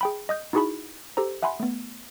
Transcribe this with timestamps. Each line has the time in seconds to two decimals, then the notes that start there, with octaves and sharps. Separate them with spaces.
0.01 G#4 G5 B5
0.29 D#5 D#6 G6
0.53 D#4 E4 F#4 G#4 A5 B5
1.17 G4 A4 C5 A#5
1.43 E5 F#5 G#5 B5 C6
1.60 A3 B3